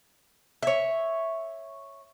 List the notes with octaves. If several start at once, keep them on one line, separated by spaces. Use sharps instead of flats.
C#5 E5